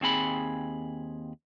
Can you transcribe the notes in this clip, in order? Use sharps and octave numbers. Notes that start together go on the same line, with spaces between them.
D#2 C4 G#4 B5